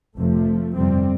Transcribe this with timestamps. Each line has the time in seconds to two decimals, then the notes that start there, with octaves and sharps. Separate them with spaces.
0.17 F1 F2 C3 F3 A3
0.76 G1 F2 C3 G3 C4